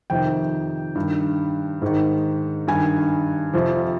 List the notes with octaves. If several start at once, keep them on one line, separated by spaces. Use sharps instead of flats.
F2 C3 D#3 G5
G2 D#3
G#2 D#3
G2 D#3 G#5
F2 C3 F3